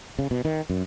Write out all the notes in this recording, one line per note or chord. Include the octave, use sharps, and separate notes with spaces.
C#3
B2
D#3
F#2